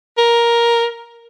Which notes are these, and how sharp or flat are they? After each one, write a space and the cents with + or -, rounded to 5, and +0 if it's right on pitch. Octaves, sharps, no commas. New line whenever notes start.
A#4 +10